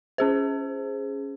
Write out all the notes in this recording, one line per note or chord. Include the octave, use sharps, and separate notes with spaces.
C#4 G#4 C5